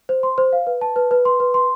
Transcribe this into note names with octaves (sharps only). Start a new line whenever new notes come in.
C5
C6
C5
F5
B4
A5
B4
B4
C6
B4
C6